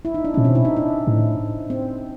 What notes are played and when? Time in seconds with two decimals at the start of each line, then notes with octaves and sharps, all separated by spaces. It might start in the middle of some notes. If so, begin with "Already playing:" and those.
0.05 E4
0.14 D#4
0.24 D4
0.34 A#2 C#4
0.44 B2 C4
0.55 E4
0.65 D#4
0.76 D4
1.07 A2
1.70 C4